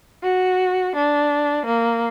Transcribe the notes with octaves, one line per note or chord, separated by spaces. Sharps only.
F#4
D4
A#3